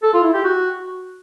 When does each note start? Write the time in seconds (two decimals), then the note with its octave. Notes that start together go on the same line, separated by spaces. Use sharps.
0.03 A4
0.13 F4
0.24 E4
0.34 G4
0.44 F#4